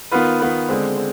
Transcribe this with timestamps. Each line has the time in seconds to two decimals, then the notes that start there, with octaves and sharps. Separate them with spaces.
0.11 D#3 B3 F4 B4
0.40 D#3 B3 F4 B4
0.69 D3 G#3 C4
0.97 C4